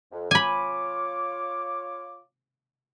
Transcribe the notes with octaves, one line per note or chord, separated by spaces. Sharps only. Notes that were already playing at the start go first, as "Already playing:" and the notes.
F2
F4 C#5 G#5 B5 D6